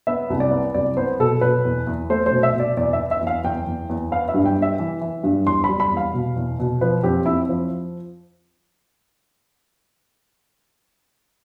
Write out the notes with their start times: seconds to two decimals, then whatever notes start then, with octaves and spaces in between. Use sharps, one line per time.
0.07 B3 E5
0.30 C2
0.40 D5
0.52 B3
0.74 C2 D5
0.97 B3 C5
1.20 B2 A4
1.41 B2 B4
1.65 E2
1.87 E2
2.10 A3 C5
2.26 C5
2.31 B2
2.43 E5
2.54 B2
2.60 D5
2.77 E2 D5
2.93 E5
2.99 B3
3.11 E5
3.21 E2
3.27 F5
3.44 E2 G5
3.67 E2
3.89 E2
4.12 B3 F5
4.29 E5
4.34 G2
4.46 G5
4.56 B3
4.62 E5
4.79 E3
5.01 E3
5.24 G2
5.46 E2 C6
5.64 G3 B5
5.80 B5
5.92 E2
5.97 F5
6.13 B2
6.36 E2
6.59 B2
6.81 F3 B4
7.03 F2 G4
7.26 F2 E4
7.49 F3